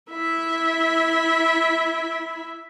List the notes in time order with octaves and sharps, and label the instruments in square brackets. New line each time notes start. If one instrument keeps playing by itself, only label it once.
[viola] E4 E5